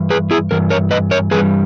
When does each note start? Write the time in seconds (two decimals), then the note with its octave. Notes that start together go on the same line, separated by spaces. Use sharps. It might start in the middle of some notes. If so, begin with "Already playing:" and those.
Already playing: G2 E3
0.10 G#4 B4
0.31 E4 G#4
0.51 G2 E3 A#4
0.70 A#4 C#5
0.91 B4 D#5
1.11 A#4 C#5
1.31 G2 E3 G3 G#4 B4